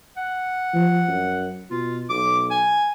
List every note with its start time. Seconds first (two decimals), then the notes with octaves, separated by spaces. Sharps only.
0.17 F#5
0.74 F3
1.08 F#2
1.71 B2 F4
2.09 B1 D6
2.50 G#5